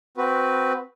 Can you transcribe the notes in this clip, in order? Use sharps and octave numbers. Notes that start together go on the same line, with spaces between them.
C4 F#4 B4